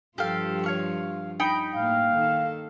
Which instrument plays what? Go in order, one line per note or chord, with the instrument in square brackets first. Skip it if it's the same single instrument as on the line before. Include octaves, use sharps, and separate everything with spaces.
[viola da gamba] G2 F3 F4 [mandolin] G4 A4 F5
[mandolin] C#5 F5 C#6
D#4 G5 B5
[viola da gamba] A2 A#3 [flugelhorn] F5
[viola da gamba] D#3 A4